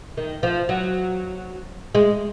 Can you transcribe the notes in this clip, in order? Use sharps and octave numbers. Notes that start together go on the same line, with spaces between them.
D#3
F3
F#3
G#3